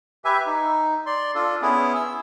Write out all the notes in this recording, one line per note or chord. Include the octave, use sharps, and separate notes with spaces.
G4 B4 E5 G#5
D#4
D5 C6
D4 F4 A4
B3 C#4 E4 G#4
E6